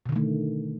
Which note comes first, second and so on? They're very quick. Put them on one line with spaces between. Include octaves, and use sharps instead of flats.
B2 D3 D#3 A3